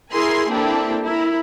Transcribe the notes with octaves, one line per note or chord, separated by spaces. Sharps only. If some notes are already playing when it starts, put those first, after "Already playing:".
E4 G#4 A#4 G#5 C6
A#3 C4 D4 E4 G4 A4
E4 A#4